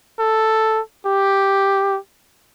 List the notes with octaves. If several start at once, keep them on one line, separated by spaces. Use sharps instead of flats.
A4
G4